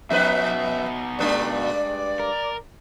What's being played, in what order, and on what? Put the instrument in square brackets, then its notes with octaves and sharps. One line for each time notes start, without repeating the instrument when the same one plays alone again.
[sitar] F2 B4 [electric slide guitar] B2 B3 D#4 [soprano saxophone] E5
[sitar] G2 G#3 D4 [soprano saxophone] D5
[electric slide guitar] A#4